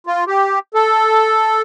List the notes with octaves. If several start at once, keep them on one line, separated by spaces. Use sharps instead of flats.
F4
G4
A4